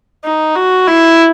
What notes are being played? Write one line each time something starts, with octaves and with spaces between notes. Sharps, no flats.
D#4
F#4
E4